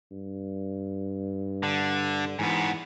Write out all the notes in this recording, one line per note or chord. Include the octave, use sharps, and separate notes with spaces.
G2
D3
G#2 E3 B3